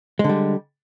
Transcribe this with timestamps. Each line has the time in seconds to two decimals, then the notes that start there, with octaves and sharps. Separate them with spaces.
0.19 G#3
0.24 D3
0.29 G3